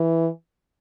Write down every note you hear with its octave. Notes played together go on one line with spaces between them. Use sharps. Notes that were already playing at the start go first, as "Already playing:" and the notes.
Already playing: E3